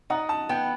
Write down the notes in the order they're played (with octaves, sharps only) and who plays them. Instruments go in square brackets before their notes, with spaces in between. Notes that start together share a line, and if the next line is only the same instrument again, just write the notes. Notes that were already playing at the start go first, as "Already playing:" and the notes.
[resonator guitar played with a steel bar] D#4 [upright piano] F#5
[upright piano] A5
[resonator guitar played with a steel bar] B3 [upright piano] G5